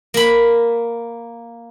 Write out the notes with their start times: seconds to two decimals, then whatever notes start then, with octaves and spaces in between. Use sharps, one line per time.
0.14 A#3 B5